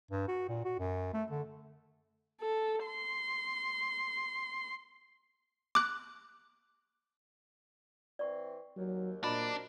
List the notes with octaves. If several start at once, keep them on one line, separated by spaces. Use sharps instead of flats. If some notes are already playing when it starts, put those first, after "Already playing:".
G2
F#4
A#2
F#4
F#2
A3
D3
A4
C6
D6 F#6
E3 C4 D5 C#6
D#2 F#3
A#2 C4 D4 F#4 A#4 D5 D#5 B5